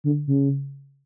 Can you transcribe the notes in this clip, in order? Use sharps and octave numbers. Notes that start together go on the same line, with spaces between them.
D3
C#3